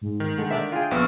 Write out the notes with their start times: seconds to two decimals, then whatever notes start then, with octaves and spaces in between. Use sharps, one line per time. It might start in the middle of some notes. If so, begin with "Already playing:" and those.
0.02 G#2
0.20 D#3
0.38 D3 G#3
0.50 D4 D5 E5
0.72 F4 G#4 G5 D7
0.91 A#1 B3 C#6 E6 F6